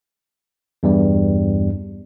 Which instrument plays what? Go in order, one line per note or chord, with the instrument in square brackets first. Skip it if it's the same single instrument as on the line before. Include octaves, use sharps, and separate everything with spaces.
[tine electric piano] E2 G2 G3